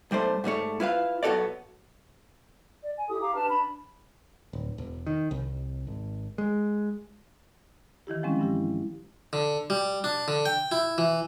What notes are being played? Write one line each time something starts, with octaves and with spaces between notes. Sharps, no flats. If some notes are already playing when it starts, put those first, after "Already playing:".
B1 G3 A3 C5
G#2 G3 A3 C#5
E4 F4 B4 F5
B1 B3 F#4 A4 C#5 D5
D5
G#5
E4 G4 A4 D#6
G4 F5 A#5 D6
D4 B4 A5 F6
D4 B5
D1
E1
D#3
C2
G#1
G#3
D#3 E3 E4 G4
F3 G3 G#3 C4 C#4
G2 E4 G4
D3
G3
D4
D3
G5
E4
E3